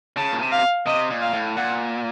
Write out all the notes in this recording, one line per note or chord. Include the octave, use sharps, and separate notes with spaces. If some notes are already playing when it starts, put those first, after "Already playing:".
C#3 A5
A#2
C3
F5
C3 D#5
A#2
F5
A2
A#2 F#5